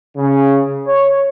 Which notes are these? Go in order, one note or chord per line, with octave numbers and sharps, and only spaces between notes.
C#3
C#5